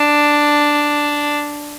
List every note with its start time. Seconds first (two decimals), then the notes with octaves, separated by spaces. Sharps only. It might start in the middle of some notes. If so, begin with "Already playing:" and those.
Already playing: D4